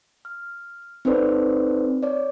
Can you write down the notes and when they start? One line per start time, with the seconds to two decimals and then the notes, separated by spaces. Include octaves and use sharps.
0.25 F6
1.05 C4 D#4 A4 B4 C5 D5
2.03 C#5 D5